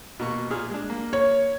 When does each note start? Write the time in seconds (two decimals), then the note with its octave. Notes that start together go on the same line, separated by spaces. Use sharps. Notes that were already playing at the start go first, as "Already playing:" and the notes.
0.20 B2 A#3 C#6
0.50 A#2 G#4 F6
0.70 G#3 D4
0.90 A#3
1.13 C#5